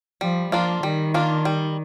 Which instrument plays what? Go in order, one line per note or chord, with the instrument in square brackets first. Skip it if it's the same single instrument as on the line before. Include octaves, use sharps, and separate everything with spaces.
[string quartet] F3 [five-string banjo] G3
[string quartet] F3 [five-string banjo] A#3 D4 F4
[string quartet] D#3 [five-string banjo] G3
[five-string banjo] A#3 D4 F4
G3